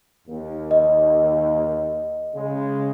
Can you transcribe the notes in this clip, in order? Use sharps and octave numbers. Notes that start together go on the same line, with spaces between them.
D#2
D#5
C#3 G#3